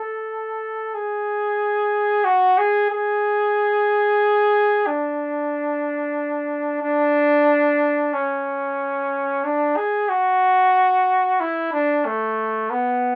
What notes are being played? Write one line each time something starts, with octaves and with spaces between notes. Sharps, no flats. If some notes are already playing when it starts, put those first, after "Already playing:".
Already playing: A4
G#4
F#4
G#4
G#4
D4
D4
C#4
D4
G#4
F#4
E4
D4
A3
B3